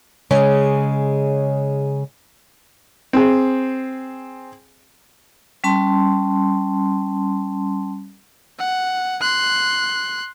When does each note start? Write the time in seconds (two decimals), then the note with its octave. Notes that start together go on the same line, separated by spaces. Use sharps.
0.31 C#3 G#3 C#4
3.13 C4 G#4
5.64 G3 C#4 A5 C6
8.59 F#5
9.21 C6 F#6